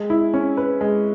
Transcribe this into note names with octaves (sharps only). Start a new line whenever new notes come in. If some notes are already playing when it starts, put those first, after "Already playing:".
Already playing: G#3
E4
C#4
B4
G#3